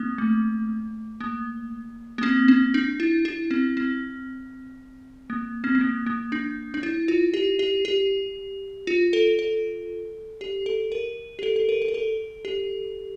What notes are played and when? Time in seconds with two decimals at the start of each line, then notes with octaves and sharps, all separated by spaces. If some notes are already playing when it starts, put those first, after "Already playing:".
Already playing: A#3 C4
0.18 A3
1.20 A#3
2.18 A#3
2.23 C4
2.48 C4
2.74 D4
3.00 E4
3.25 E4
3.51 C4
3.77 C4
5.30 A#3
5.64 C4
5.75 C4
5.81 A#3
6.06 A#3
6.32 D4
6.74 D4
6.83 E4
7.08 F4
7.34 G4
7.59 G4
7.85 G4
8.87 F4
9.13 A4
9.39 A4
10.41 G4
10.66 A4
10.92 A#4
11.39 G4
11.43 A4
11.56 A4
11.69 A#4
11.82 A4
11.88 A#4
11.94 A4
12.45 G4